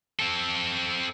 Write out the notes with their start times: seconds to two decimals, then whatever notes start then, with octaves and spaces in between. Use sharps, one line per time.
0.20 C4 A4